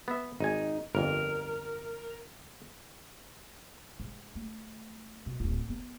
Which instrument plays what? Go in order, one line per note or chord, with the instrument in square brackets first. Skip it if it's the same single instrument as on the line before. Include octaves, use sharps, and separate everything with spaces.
[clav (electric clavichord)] B3 E5
[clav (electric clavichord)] G#1 G#5 [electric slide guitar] D#4
[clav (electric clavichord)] G1 F2 [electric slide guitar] A#4
[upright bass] G#2
A3
B2
D1 F4
B3